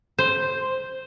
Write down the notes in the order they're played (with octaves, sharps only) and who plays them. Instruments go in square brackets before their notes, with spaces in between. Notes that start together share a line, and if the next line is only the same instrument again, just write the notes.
[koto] C5